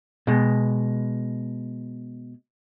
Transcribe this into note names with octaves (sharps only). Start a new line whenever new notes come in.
B2 G#3